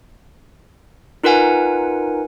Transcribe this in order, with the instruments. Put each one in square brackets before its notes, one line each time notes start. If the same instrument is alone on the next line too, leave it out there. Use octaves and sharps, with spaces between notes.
[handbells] D#4 F4 A#4 B4 F#5 G#5